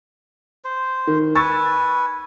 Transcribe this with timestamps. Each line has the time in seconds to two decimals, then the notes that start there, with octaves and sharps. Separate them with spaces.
0.64 C5
1.07 D#3
1.35 B4 G#5 C#6 E6 A6